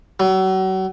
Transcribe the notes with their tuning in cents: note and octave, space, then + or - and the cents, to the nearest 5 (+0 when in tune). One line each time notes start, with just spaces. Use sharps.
F#3 +35